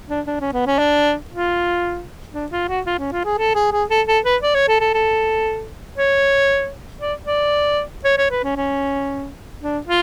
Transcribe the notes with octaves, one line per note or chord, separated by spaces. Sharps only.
D4
D4
C#4
B3
C#4
D4
F4
D4
F4
F#4
F4
C#4
F4
G#4
A4
G#4
G#4
A4
A4
B4
D5
C#5
A4
A4
A4
C#5
D5
D5
C#5
C#5
B4
C#4
C#4
D4
F4